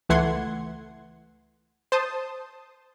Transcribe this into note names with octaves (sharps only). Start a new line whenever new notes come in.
C#2 E3 A3 F#5 C6 G#6
C5 A5 D#6